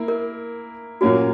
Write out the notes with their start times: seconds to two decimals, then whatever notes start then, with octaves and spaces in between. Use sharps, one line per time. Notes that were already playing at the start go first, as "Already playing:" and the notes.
Already playing: A#3 E4
0.08 A#4
1.01 A#2 F#3 A#3 C#4 F#4